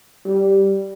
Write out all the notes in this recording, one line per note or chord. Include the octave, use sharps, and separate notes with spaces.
G3